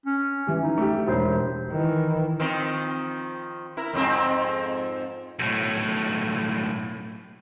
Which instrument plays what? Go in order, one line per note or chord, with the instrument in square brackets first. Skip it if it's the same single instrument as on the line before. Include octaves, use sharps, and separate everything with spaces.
[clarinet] C#4
[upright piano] E3 G3
[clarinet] D#4 [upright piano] E4
[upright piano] A3 G4
[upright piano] E1 [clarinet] C5
[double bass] D#3 E3
[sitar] D#3 F3 C4
E4 A#4
F2 G#2 C4
[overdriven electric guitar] B1 A2